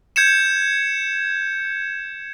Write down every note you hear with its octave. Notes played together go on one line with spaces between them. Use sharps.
G6 G#6 C#7 E7